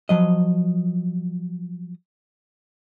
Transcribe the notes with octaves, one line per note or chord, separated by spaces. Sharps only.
F3 F#3 D#5